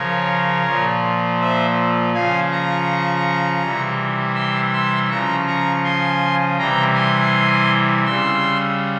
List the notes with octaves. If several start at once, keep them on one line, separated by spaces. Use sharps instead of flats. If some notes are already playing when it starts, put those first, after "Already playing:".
Already playing: C#3 F3 A#4 C#5
A#2 F3
C5 E5
C#3 F3 F5 G#5
A#5 C#6
C3 E3 G3
C6 E6
C6 E6
C#3 F3 A#5 C#6
A#5 C#6
G#5 C6
C3 E3 G3 G5 A#5
G#5 C6
C#3 G3 C6 E6